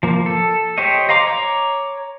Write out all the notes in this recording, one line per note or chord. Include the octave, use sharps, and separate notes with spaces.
F3 A#3
A4
G4 C5 C#5 D#5
D#5 F5 A#5 C6 D6
C#5 A#5 D6